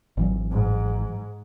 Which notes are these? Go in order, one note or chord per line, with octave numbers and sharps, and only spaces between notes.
G#1 E3 F#3
G#2